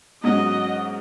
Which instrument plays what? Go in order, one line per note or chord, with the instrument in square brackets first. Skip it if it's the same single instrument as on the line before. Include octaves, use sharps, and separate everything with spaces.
[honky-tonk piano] G#2 F#3 C#4 F#4 [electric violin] D#5